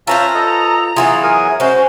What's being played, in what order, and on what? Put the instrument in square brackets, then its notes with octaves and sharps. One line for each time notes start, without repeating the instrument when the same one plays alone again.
[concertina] C#4 E5 A5 [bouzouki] F4 B4 C5 [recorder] A#5
[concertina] A4 D#5
[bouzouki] E3 F#3 B3 [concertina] F4 G#4
[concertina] G#4 A#4 G#5
[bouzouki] G#3 C#4 [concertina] F#4 [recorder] C5